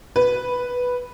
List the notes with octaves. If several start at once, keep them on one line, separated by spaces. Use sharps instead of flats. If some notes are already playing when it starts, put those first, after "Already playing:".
B4